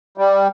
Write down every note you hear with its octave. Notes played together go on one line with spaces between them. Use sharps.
G3